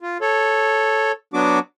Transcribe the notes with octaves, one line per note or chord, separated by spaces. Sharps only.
F4
A4 C#5
F#3 B3 D4 F#4 D6